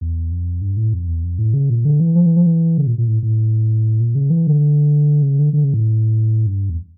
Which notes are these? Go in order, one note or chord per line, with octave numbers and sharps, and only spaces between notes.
E2
F2
G2
A2
F2
E2
F2
A2
C#3
A#2
D3
E3
F3
E3
F3
E3
C#3
A#2
A#2
A2
A2
A#2
C#3
E3
D3
C#3
D3
D3
C#3
A2
G2
E2